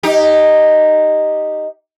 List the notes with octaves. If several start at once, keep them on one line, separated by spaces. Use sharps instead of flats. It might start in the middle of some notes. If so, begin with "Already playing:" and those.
D#4 G4